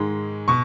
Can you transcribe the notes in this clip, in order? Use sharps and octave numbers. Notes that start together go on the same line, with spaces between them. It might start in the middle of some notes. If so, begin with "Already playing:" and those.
Already playing: G#2 D#3 G#3
B2 C#6